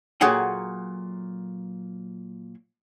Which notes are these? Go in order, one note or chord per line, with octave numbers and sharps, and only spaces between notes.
A#2 F#3 G#4 A4 F#5 G5